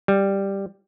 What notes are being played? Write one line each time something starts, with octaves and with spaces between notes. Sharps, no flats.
G3